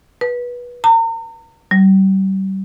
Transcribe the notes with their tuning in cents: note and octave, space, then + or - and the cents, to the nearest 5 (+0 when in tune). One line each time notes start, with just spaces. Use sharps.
B4 -20
A#5 -40
G3 -35